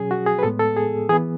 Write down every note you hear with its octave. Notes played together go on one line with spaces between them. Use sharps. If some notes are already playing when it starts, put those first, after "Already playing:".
Already playing: B2 F#3 C#4 G#4
F#4
G#4
B4
A2 G#3 B3 A4
A4
G#4
E3 B3 G#4